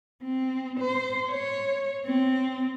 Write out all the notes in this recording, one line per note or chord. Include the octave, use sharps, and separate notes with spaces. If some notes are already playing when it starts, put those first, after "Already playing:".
C4
C5
C#5
C4